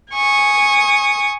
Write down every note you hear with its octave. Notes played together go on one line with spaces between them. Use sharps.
G#5 C#6 D#6